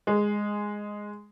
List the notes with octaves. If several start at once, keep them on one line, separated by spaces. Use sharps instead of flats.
G#3